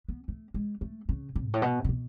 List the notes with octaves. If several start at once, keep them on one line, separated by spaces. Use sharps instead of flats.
B3
A3
G#3
A3
C#3
D3
G#2
A2
B2
C#3
B2